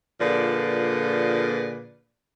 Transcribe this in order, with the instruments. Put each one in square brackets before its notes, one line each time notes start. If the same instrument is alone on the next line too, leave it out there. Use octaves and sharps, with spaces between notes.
[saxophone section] A#2 D3 F3 G#4 B4 D5